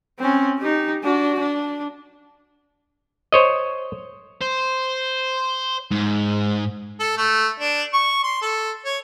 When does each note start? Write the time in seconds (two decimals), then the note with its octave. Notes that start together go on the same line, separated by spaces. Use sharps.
0.19 C4 C#4
0.59 D#4 G4
1.03 D4 F#4
1.39 D4
3.32 C5 C#5 D#5
4.42 C5
5.91 G#2
7.00 A4
7.17 A3
7.60 D4
7.93 C#6
8.24 C6
8.42 A4
8.85 C#5